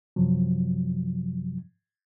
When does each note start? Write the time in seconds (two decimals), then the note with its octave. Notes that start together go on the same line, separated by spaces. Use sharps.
0.16 F#2 C3 F3 F#3